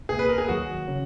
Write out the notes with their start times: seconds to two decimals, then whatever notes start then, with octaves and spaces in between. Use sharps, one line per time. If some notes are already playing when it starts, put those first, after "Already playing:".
0.09 C#2 B2 A#3 G#4
0.19 B4
0.29 A#4
0.38 G#4
0.48 D#2 D#3 F#3 F#4
0.88 C#3 F#3 C#4